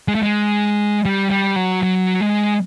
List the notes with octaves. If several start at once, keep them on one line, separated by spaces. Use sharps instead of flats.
G#3
A3
G#3
G3
G3
F#3
F#3
G#3